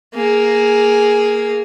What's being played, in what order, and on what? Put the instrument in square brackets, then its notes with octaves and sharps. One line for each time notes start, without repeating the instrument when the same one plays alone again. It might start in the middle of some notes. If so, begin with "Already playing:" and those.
[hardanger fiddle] A#3 G#4